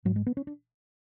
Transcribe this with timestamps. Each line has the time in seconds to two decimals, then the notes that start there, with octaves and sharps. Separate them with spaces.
0.05 G#2 F#3
0.16 G#3
0.27 B3
0.37 C#4
0.47 D4